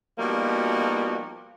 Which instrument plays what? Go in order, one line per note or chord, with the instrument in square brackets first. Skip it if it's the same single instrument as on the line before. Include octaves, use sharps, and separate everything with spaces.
[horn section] B2 F3 G3 A#3 D#4 F#4